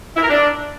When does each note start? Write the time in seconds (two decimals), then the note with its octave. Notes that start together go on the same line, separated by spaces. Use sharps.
0.15 E4
0.22 A#4
0.29 D4